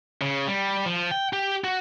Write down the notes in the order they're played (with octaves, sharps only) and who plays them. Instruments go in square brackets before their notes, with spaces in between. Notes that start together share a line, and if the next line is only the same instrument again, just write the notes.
[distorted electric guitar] C#3
G3
F3
G5
G4
F#4